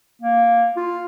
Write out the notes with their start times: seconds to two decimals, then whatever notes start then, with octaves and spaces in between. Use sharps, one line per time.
0.22 A#3
0.77 F4